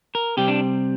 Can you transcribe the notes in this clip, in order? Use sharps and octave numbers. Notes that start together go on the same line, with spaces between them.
A#4
C3 G3 C4 G4
D4